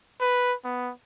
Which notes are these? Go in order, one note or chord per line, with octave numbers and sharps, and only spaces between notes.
B4
B3